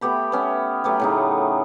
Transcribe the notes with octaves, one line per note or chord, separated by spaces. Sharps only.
A3 B3 G4 B5
B3 C#4 E5
F#3 A3 B3 G4
A2 C#3 D#4